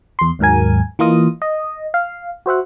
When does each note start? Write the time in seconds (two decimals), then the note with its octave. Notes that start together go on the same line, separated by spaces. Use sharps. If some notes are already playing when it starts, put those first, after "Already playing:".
0.19 E2 C6
0.39 D#2 G#2 F#3 A#4 G#5
0.99 E3 A#3 F4 D#5 D#6
1.42 D#5
1.94 F5
2.46 F#4 C5 E5 F#5